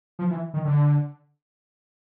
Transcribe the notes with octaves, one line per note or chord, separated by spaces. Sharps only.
F3
E3
D#3
D3